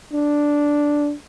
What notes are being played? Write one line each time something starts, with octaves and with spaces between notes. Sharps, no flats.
D4